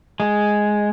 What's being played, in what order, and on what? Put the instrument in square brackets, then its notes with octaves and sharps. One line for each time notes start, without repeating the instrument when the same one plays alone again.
[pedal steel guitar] G#3